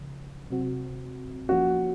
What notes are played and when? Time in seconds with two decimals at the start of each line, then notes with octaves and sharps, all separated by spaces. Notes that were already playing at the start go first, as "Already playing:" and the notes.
Already playing: C#3 F3
0.50 C3 F#3 C4 F#4
1.49 F3 A#3 C#4 F#4